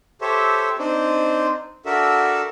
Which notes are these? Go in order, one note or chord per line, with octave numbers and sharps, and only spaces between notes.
G4 A4 C5 C#5 E5
C4 D4 D#4 C5
D4 F#4 A4 A#4 E5